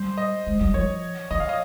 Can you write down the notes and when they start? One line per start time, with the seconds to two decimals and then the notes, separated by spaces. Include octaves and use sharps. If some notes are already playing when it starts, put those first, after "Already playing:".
Already playing: G3 C5
0.18 D#5
0.47 G#3
0.61 G3
0.74 F3 C#5
1.31 F3 D#5
1.40 F5
1.49 D#5